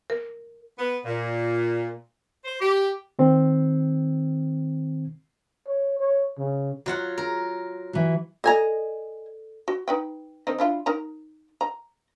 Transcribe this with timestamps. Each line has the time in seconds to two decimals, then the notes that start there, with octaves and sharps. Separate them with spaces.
0.10 A#4
0.79 B3
1.04 A#2
2.45 C5
2.61 G4
3.19 D#3 C4
5.67 C#5
6.00 C#5
6.38 C#3
6.86 F#3 F4 F#5
7.18 A#4
7.93 E3 F#3
8.44 A4 D5 D#5 G#5 A#5
9.68 F#4
9.88 D#4 B4 G5
10.47 D#3 C4 D#4
10.59 D4 E4 F4
10.86 D#4 A#4 A#5
11.61 A#5